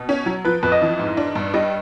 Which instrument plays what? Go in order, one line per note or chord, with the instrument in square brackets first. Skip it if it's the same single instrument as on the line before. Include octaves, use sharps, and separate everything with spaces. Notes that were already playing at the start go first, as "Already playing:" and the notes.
Already playing: [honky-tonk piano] B2
C#4
F#3
[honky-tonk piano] F3 [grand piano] B4
[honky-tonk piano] F2 [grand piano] B4
[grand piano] D#5
[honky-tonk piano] E3
G#2
D4
G2
[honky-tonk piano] G3 [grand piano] D#5